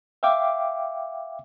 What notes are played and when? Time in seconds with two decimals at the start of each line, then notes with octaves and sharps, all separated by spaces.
0.23 E5 F5 G5 D6